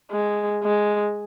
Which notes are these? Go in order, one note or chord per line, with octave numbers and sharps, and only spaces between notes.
G#3
G#3